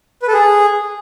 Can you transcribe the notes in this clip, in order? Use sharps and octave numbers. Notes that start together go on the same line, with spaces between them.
B4
A4
G#4